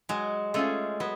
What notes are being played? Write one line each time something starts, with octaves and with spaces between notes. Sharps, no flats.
F#3 G#3
G#3 A3 C#4 F4
F#3 B3